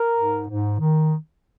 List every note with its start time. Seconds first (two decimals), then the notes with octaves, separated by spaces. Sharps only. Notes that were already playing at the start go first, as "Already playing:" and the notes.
Already playing: A#4
0.16 G#2
0.47 G#2
0.78 D#3